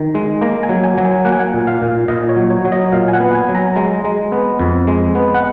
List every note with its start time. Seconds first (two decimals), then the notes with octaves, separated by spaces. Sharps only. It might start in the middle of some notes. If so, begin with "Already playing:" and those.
Already playing: D#3
0.15 G#3
0.41 A#3 A#5
0.63 G#5
0.69 F#3
0.83 G#5
0.97 F#3
1.05 G#5
1.25 A#3 F#5
1.32 G#5
1.39 F#5
1.53 A#2
1.67 F5
1.82 A#2
2.08 A#2 D#5
2.29 C#5
2.36 F#3
2.50 C#5
2.64 F#3
2.72 D#5
2.92 A#2 F5
3.08 G#5
3.13 F#5
3.20 B3
3.35 G#5
3.49 F#3
3.55 A#5
3.75 G#3 A#5
4.04 G#3
4.32 B3
4.59 F2
4.87 G#3
5.15 B3
5.34 F#5